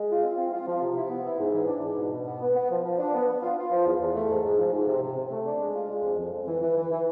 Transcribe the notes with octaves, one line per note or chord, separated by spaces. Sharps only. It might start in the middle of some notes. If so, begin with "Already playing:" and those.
Already playing: G#3
F4
C4
C4
F4
F3
C3
E4
B3
E4
G#2
E3
D4
G#2
B2
B2
B3
B3
B3
F3
F3
D4
B3
B3
F4
F4
F3
E2
E2
A3
G#2
G#2
F3
G#2
C3
C3
C3
A3
D4
G#3
F4
G#3
F2
F2
F2
E3
E3
E3
E3